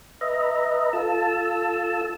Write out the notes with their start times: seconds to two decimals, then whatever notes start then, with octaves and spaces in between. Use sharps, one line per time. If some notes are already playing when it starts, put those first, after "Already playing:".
0.21 B4 D#5 E5 A#5
0.93 F4 A4 A5 E6